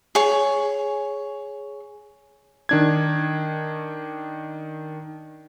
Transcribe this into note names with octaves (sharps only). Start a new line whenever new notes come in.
G#4 C#5
D#3 D4 G#6